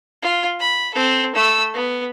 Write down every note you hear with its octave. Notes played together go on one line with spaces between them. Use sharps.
F4
B5
C4 A4
A3 E6
B3